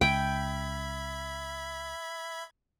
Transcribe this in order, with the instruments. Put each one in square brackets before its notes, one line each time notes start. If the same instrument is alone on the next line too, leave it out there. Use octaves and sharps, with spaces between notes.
[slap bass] C#2 [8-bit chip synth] E5 B5 G#6 [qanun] G5